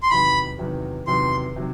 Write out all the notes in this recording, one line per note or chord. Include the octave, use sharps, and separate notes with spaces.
C6
E2 C3 D#3 F#3 B5
E2 C3 D#3 F#3
E2 C3 D#3 F#3 C6
C3 D#3 F#3